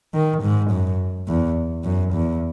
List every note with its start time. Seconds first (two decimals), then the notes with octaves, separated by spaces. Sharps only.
0.14 D#3
0.42 G#2
0.71 F#2
1.29 E2
1.84 F#2
2.14 E2